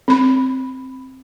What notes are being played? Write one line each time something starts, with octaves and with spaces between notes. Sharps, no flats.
C4 B5